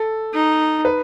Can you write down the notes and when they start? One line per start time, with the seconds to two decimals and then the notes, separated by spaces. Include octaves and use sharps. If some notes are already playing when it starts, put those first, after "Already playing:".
Already playing: A4
0.34 D#4
0.85 B4